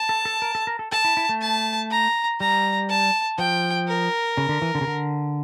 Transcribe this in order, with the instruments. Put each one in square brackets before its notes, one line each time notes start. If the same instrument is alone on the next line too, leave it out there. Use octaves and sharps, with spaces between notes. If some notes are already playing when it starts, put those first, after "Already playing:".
Already playing: [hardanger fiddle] A5
[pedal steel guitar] A4
A4
A#4
A4
A#4
A4
[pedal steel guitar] A4 [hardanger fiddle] A5
[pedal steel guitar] E4
E4
A3
[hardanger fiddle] A5
A#5
[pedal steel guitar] G3 [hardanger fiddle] A#5
[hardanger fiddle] A5
[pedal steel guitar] F3 [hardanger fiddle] G5
[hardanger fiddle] A#4
[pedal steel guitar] C#3
D3
E3
D3
C#3
D3